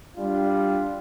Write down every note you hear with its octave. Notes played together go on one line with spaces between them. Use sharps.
G3 D4 F4